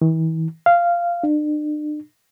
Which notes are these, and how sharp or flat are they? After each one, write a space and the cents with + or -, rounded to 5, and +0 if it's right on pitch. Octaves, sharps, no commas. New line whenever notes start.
E3 -40
F5 -10
D4 +40